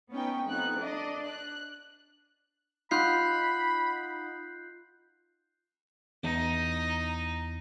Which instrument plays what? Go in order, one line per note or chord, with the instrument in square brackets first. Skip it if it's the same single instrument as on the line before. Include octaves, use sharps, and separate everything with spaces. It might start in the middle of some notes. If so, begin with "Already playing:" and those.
[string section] B3 C#4 D#4 G5
F2 B3 D#4 F#6
D4 D5 D#5
F#6
[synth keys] D#4 F#5 [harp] F4 [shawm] B5 [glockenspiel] F#6 G6 C7
[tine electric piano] E2 [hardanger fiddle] D#4